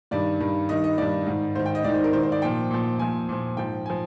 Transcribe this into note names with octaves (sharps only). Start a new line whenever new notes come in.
G2 D#3 D5
G2 D#3
G2 D#3 D#5
D#5
G2 D#3 D5
G#2 D#3
G#2 D#3 C5
G5
D#5
G#2 D#3 D5
C5
A#4
G#2 D#3 C5
C5
D5
A#2 F3 G5
A#2 F3
A#2 F3 G#5
A#2 F3
G#2 F3 G5
F3 G#5